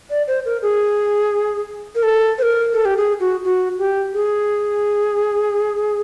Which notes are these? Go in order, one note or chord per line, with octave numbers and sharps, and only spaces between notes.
D5
C5
A#4
G#4
A#4
A4
C5
A#4
A4
G4
G#4
F#4
F#4
G4
G#4